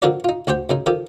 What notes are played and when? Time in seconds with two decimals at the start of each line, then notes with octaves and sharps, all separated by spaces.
0.02 D3 F3 D4 F#4 A#4 D5
0.24 D#4 F4
0.47 D2 F#4 G4 C5 G5
0.69 F#2 C#3 D#4
0.86 D#3 F3 G4 A4